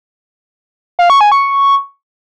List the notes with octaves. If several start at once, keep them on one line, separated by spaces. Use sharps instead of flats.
F5
C#6
G#5
C#6